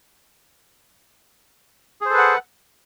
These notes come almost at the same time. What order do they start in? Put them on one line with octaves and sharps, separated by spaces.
G#4 C5 A4 B4 F#5